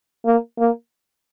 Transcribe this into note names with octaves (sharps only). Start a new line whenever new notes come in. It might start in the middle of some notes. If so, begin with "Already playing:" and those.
A#3
A#3